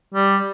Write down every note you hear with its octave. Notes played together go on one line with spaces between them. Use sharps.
G3